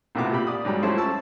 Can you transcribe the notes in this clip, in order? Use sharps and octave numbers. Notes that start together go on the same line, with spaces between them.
A#1 A2 C3 B3 F#4 D6
A#2 G4 B5
D5 D#6
G#2 F#3 G3 A#5 B5
F3 G3 A3 C#4 E4 C5
A5 C#6 E6